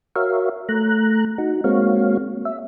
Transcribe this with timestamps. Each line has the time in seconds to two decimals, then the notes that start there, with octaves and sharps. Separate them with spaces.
0.16 F#4 A#4 C#5 E5 F5
0.69 A3 A#5 F#6
1.38 D#4 F#4
1.64 G#3 A#3 C4 F#4 C#5 F5
2.45 E5